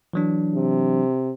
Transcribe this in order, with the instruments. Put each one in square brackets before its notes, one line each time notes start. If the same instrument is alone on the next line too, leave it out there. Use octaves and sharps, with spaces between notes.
[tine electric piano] E3 F#3 D4
[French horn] C3